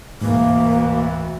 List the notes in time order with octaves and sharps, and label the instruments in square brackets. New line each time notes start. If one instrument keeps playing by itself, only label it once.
[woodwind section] D2 B2 E3 [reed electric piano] G#2 [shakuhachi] A#3